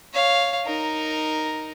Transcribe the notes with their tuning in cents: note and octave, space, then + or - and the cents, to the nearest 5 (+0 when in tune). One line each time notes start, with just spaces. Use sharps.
C#5 +0 F5 +0
D#4 +0 A#4 +0